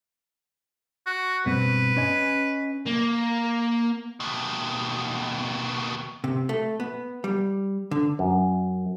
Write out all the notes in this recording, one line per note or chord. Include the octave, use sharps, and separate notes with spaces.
F#4
G2 B2 C4 B4
C#4 D#5 G#5
A#3
D#2 B2
C3
A3
B3
G3
D3
F#2